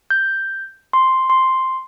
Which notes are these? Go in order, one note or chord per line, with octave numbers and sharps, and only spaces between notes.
G6
C6
C6